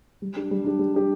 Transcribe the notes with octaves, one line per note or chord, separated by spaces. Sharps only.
G3
D4 G4
G3
D4 G4
G3
D4 G4